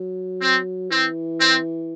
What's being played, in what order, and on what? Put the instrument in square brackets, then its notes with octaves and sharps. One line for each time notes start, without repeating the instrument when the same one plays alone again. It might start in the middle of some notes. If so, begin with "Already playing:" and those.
Already playing: [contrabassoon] F#3
[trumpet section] C4
[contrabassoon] E3 [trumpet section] C4
[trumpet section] C4